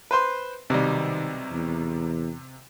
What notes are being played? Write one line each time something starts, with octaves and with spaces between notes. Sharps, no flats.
B4 C5 C6
B1 C3 D#3 G3
E2